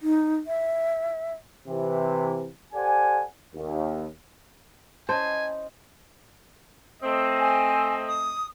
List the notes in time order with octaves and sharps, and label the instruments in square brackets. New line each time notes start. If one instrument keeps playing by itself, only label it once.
[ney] D#4
E5
[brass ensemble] C3 E3
G4 A4 C5 D5 F#5 G#5
D#2
[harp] C#4 E4 D#5 [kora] C5 [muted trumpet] G#5 [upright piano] A5
[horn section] A3 C4 D#5
[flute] G#5
D#6